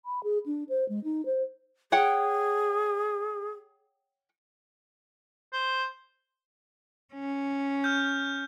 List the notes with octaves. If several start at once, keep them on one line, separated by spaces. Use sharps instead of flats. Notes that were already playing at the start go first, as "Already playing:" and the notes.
B5
G#4
D4
C5
G#3
D#4
C5
G#4 C#5 F#5 G5
C5
C#4
F6 G6